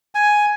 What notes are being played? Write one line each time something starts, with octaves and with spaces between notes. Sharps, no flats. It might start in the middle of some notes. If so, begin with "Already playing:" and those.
G#5